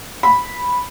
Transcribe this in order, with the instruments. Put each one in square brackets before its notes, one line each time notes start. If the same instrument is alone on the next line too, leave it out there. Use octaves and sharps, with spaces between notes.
[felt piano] B5